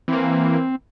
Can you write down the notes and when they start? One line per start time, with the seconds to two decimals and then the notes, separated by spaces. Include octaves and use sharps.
0.08 E3 A#3 C4